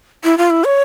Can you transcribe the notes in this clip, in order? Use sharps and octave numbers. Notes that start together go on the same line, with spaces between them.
E4
F4
E4
C#5